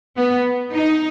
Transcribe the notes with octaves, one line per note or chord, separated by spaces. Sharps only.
B3
D#4